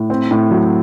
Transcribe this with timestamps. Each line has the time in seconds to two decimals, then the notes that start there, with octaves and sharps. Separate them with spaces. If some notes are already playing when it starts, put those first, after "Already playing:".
Already playing: A2
0.10 C4
0.31 A2
0.51 F#3